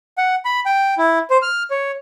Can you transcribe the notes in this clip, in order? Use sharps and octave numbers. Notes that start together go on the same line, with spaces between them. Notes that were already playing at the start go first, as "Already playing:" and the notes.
F#5
B5
G5
E4
C5
F6
C#5